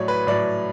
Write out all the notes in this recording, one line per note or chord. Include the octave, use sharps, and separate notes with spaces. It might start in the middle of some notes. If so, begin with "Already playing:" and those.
Already playing: A2 F#3 C#5 D5
B4
A2 F#3 D5